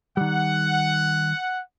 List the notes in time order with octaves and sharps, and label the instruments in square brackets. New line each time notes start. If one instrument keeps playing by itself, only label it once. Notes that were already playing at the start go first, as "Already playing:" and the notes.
[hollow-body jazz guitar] D#3 G3 [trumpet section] F#5